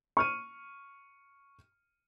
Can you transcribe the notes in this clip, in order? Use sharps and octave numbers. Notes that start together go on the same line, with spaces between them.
C#6 F6 D#7